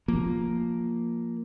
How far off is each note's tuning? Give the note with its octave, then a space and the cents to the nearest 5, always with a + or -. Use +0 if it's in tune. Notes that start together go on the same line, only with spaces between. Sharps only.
F3 +0 A#3 +0